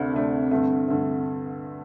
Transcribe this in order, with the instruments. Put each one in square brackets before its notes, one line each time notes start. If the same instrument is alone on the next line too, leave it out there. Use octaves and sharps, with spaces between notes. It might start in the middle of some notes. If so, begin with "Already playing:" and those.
Already playing: [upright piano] D2 C3 A3 D4 [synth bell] C4
[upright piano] D2 C3 A3 D4
G2 D3 A3
G2 D3 A3